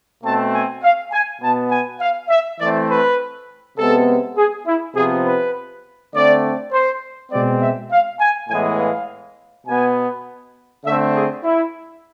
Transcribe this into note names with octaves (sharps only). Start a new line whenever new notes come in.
B2 A3 C4 A5
G#5
F5
G#5
B2 B3 A5
G#5
F5
E5
E3 A3 C4 D5
B4
C3 G#3 B3 A4
G#4
E4
C3 F3 B3 G#4
B4
D3 A3 C4 D5
C5
B2 G#3 C4 D5
E5
F5
G#5
A2 E3 G#3 B3 G#5
F5
B2 B3 G#5
D3 A3 C4 E5
G#4
E4